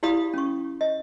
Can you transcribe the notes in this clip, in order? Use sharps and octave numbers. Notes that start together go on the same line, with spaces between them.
E4 G4 D5 F5 B5 D#6
C#4 C#6
D#5